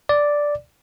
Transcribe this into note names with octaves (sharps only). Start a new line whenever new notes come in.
D5